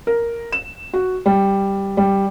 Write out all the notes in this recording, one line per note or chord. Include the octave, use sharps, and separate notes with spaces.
A#4
E7
F#4
G3
G3